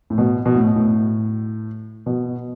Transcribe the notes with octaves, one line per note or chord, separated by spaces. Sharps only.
A2
B2
B2
A2
A2
B2